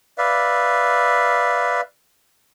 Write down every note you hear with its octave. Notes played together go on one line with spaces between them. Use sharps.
B4 D5 E5 F5